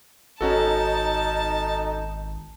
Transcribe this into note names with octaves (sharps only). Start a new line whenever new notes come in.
G#1 C#4 D#4 F#4 A4 A5